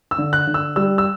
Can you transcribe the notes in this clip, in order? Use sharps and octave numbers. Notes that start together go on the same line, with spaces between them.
E6
D3
F#6
D3
E6
G3 E6
E6